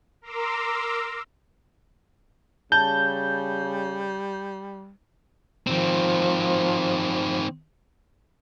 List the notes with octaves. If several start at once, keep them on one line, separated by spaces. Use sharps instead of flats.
A#4 A#5 C6 D6 E6
C#3 G3 A5 G6
D#3 F3 C4